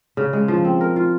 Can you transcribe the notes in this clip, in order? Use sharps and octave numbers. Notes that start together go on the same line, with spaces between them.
C#3
G#3
F3
C4
A#4
F4